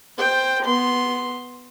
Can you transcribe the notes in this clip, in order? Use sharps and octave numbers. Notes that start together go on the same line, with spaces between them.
C5 G5
B3 C6